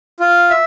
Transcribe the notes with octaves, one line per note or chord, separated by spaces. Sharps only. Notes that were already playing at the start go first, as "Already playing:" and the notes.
F4
E5